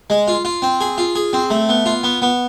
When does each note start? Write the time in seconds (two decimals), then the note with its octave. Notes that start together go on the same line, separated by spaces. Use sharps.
0.10 G#3
0.28 F4
0.45 F4
0.62 C4
0.81 G#4
0.98 F4
1.15 G#4
1.33 C4
1.50 A3
1.69 B3
1.86 F4
2.03 B3
2.22 B3